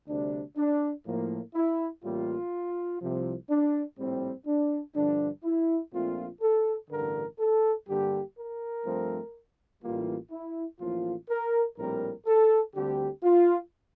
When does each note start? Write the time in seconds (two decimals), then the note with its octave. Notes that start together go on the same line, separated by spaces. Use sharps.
0.08 D2 C3 G3 D4
0.57 D4
1.06 A2 F3 A#3
1.55 E4
2.03 A1 A2 G3 A#3 F4
3.01 C2 C3 F3
3.49 D4
3.98 A#1 A2 G3 C4
4.46 D4
4.95 G2 D3 F3 D4
5.44 E4
5.93 A#1 A#2 A3 C4 F4
6.42 A4
6.90 A1 G2 D3 A#4
7.39 A4
7.88 G2 D3 G3 A#3 G4
8.37 A#4
8.85 G2 F3 A3 C4
9.83 A1 A2 E3 G3 A#3 F4
10.31 E4
10.80 A1 A2 F3 A#3 F4
11.29 A#4
11.77 A#1 A2 G3 C4 A#4
12.27 A4
12.75 D2 D3 G3 C4 G4
13.24 F4